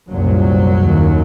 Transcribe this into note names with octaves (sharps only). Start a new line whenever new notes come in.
C2 F#2 A#2 F#3
D#2